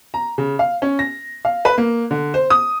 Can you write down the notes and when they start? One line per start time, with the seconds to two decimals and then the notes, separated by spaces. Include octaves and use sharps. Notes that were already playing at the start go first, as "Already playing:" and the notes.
0.14 A#5
0.38 C#3
0.59 F5
0.82 C#4
0.99 A#6
1.45 F5
1.65 B4
1.78 A#3
2.11 D3
2.34 C5
2.50 D#6